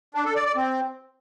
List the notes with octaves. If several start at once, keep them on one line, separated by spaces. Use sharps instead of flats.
D4
A4
D5
D5
C4